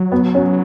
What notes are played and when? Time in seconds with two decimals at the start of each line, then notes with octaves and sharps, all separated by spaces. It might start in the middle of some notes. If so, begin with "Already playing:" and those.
Already playing: F#3
0.12 B3
0.35 C#4